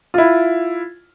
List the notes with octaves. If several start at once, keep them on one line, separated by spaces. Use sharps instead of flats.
E4 F4